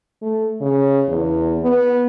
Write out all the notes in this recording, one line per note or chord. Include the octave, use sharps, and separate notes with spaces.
A3
C#3
E2
B3